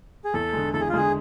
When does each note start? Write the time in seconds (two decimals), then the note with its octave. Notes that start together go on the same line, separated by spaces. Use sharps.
0.24 G#4
0.34 E2 A4
0.53 D3 G#3
0.73 E2 A4
0.81 G#4
0.89 F4
0.94 D3 G#3 G#4